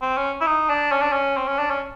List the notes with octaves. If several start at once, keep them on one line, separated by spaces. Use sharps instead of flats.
C4
C#4
E4
D#4
D4
C#4
D4
C#4
C4
C#4
D4
C#4